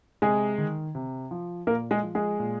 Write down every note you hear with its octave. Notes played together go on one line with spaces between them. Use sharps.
C3 G#3 G#4
D#3
C3
F3
A#2 A#3 A#4
G#3 G#4
F3
G#3 G#4
A#2